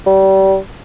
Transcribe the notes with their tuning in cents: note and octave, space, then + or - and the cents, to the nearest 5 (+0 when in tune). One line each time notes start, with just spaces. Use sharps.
G3 -30